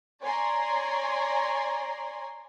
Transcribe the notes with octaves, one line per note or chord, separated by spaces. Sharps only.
C#5 D5 G#5 A#5 C6